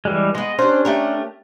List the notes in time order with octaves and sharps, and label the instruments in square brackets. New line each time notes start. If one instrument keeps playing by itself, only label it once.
[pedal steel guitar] E3 G3 G#3
[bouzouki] G#3 B3 [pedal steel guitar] D#5
[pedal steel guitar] C#4 D4 [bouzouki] G4 C5
[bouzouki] A3 G4 A#4